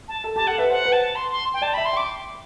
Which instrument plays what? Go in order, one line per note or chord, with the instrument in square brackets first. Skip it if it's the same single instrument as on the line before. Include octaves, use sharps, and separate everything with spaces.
[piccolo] A5
[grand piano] A4
[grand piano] G4 [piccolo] A5
[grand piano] A4 [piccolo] F#5
[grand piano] B4 [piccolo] E5
[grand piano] C5 [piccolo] F#5
[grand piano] B4
[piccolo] A5
C6
C6
G5
[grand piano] D5 [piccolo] A5
[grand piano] E5 [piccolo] B5
[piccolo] C6
[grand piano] G5 [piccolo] D6